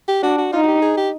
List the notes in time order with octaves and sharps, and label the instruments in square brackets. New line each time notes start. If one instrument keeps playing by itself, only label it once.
[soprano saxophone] G4
[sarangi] D4 [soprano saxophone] F#4
[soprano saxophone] F#4
[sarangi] D#4 [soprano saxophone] F4
[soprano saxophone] F#4
G4
G#4
G4